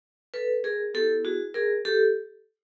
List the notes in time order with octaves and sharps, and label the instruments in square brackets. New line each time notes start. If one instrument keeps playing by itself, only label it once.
[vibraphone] A4 B4
G#4 A#4
B3 E4 G4 A4
F#4 G#4
G#4 A#4
G4 A4